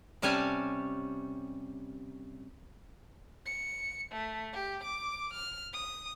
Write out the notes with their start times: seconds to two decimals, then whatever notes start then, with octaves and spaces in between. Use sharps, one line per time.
0.22 C3 G3 C#4 C#5 G#5 A5
3.46 C#7
4.12 A3
4.53 G4
4.84 D6
5.34 F6
5.73 D#6